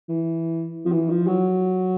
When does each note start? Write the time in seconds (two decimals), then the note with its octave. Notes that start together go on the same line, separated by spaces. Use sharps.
0.09 E3
0.85 F3
0.92 E3
1.10 F3
1.27 F#3